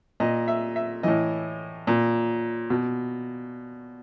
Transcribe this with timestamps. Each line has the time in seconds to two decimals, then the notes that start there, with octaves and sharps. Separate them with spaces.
0.20 A#2 D#5
0.48 E5
0.76 E5
1.03 A2 E3 D#5
1.87 A#2
2.70 B2